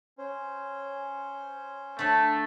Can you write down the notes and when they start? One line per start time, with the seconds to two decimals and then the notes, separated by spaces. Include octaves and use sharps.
0.18 C#4 C5
1.99 D3 A3 D4